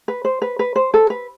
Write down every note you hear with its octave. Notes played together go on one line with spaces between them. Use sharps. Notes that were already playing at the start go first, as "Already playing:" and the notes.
B4
C5
B4
B4
C5
A4
B4